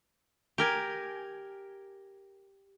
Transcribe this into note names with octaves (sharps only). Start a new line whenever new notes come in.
G4 A#4 G#5